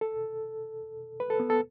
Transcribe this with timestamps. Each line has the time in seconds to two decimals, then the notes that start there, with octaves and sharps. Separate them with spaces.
0.01 A4
1.20 B4
1.30 A4
1.40 B3
1.50 A4